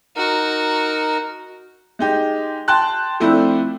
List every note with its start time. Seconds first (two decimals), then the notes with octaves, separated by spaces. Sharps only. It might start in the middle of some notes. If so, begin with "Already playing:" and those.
0.16 D#4 F#4 A#4
1.99 G#3 D#4 G4
2.68 G5 A5 C6 F#6
3.20 F3 A3 C4 D4 E4